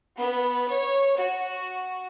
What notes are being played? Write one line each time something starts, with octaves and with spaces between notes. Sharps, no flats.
B3
C#5
F#4